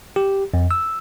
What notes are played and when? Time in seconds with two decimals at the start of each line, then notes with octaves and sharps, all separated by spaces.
0.16 G4
0.54 F2
0.71 E6